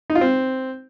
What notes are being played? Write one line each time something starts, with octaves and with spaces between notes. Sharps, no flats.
D#4
F4
C4